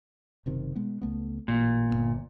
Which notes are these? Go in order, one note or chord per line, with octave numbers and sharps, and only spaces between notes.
F#1 C3 D#3
B2 G#3 B3
C#2 A3 B3
A1 A#2
G1 D#2 B3